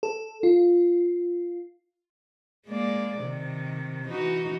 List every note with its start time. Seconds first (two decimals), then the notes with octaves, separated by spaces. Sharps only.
0.03 A4
0.43 F4
2.67 G#3 A#3 D5
3.20 C3 D#3
4.08 E3 D#4 F#4